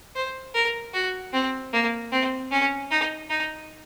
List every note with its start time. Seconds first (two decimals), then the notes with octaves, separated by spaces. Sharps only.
0.16 C5
0.54 A#4
0.93 F#4
1.33 C4
1.73 A#3
2.12 C4
2.51 C#4
2.91 D#4
3.30 D#4